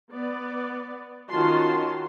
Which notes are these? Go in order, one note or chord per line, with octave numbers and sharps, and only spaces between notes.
B3 D5
D#3 C#4 F4 F#4 A5 C6